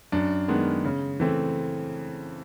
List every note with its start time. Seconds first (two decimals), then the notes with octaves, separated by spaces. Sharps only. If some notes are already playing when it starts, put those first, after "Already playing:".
0.12 F#2 D4
0.48 D#3 G#3 B3 D4
0.85 C#3
1.20 E3 A3 C4